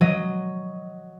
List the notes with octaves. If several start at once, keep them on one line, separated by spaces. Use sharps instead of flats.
F#3 D#5